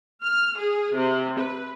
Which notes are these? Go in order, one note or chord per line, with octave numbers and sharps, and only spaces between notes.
F6
G#4
C3
B4